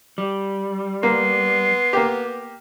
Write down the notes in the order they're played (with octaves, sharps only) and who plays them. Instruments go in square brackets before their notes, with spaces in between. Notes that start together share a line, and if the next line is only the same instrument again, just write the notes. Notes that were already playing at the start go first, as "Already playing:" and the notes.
[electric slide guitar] G3
[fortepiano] A#3 [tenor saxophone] B3 [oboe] C6
[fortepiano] A#3 G4